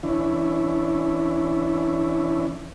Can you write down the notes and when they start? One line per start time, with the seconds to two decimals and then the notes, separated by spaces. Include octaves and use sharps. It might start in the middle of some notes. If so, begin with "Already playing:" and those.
0.03 E3 C#4 D4 E4